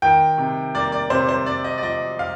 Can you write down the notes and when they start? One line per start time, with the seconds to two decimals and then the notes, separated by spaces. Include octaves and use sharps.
0.02 D#3 G5
0.38 C3
0.75 A#3 D5
0.92 D5
1.10 C3 C5
1.29 C5
1.46 C4 D5
1.64 D#5
1.78 D5
1.83 F3 D#5
2.19 F5